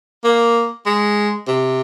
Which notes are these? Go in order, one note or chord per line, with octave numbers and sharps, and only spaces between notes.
A#3
G#3
C3